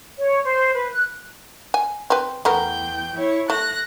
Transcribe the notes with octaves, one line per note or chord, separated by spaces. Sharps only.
C#5
C5
B4
F#6
G#5
C4 B4
E2 A3 B3 A#4 G5
E4 C#5
A3 F#6 A#6